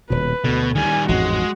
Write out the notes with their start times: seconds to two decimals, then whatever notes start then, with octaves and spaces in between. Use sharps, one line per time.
0.10 D#1 B2 B4
0.44 D2 B2 D3
0.75 D#3 G3 G#5
1.09 A1 F2 G#2 G#3 F#4